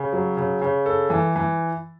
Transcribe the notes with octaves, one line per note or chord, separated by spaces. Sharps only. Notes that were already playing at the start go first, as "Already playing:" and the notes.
Already playing: C#3
F#3
C#3
C#3
A4
E3
E3